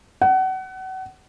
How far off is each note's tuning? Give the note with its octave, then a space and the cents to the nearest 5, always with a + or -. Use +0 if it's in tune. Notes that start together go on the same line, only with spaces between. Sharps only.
F#5 +30